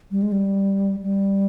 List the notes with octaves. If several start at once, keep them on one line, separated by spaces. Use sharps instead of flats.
G3
G#3
G3
G3